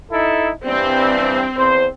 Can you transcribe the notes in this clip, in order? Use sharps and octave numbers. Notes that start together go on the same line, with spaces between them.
D#4 E4 A4
G2 E3 G3 C4
E2 C5